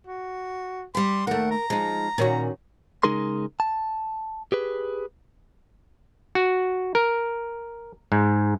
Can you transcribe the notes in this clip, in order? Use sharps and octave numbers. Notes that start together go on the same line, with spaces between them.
F#4
G3 G4 C6
D#2 A3 A#4 F#5
A#5
F3 G#3 D#4
A#2 D#3 C#4 F#4
C#3 G#3 D#4 G#4 A#4 C6
A5
G4 G#4 B4
F#4
A#4
G#2